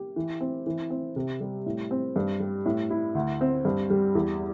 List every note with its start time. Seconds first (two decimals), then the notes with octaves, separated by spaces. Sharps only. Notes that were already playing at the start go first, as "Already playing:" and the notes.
Already playing: G4
0.16 E3
0.41 C4
0.66 E3
0.90 C4
1.16 C3
1.41 G3
1.66 A2
1.91 C4
2.16 G2
2.40 G3
2.66 A2
2.90 E4
3.15 D2
3.41 C4
3.65 G2
3.90 G3
4.15 E2